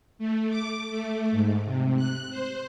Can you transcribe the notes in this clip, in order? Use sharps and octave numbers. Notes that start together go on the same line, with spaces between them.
A3
D6
A3
G#2
C3
F#6
C5